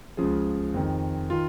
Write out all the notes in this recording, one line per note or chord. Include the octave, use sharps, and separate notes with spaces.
C#2 C#3 F3 G#4
F2 D#3
D#3 F4